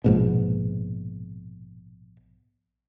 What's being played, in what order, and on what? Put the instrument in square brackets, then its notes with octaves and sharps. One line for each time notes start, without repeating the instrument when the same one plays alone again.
[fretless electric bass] A#1 G#2 B2